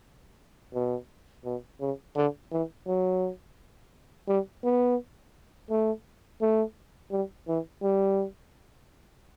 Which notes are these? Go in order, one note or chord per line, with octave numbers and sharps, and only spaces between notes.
B2
B2
C#3
D3
E3
F#3
G3
B3
A3
A3
G3
E3
G3